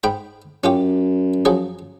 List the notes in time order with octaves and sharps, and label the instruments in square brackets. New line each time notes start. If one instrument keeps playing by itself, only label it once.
[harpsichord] G#2 G5 B5
[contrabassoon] F#2 [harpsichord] C#4 F4 G4
[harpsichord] F3 F#3 G#4